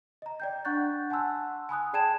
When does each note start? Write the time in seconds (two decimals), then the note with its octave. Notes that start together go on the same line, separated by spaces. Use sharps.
0.22 D#5 A#5
0.40 D5 G5 G6
0.65 D4 F#5 C#6 F#6 G6 A6
1.10 F#5 G#5 A5 C6 E6 F#6
1.69 G#5 B5 D#6 F#6
1.93 G#4 D5 G5 A5 G#6 E7